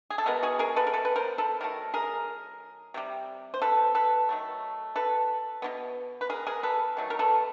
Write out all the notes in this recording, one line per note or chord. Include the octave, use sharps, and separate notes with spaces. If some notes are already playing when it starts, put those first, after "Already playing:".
G#4
A4
B2 G#3 B3 A#4
F#4 G#4
G#4 A#4
A4 B4
A#4
A4 B4
B4
A#4 C5
A4 B4
D#3 F#3 A3 A#4
G#4 A#4
C3 D#3 G3
C5
A4 B4
A4 B4
D#3 F#3 A3
A4 B4
B2 F#3 B3
B4
G#4 A#4
G#4 A#4
A4 B4
D#3 F#3 A3
A#4
A4 B4